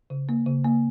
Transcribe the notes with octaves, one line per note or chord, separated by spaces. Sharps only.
C#3
A#3
C#3
A#3